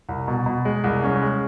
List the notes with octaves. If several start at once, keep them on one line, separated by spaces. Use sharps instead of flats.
C2
B2
B2
G#3
C2
C#4
G#3